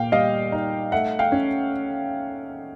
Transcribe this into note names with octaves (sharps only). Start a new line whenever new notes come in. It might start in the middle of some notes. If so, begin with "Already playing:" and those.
Already playing: A#2 F5 G5
G3 D#5 F5
D#4
A3 E5 F#5
F5 G5
C#4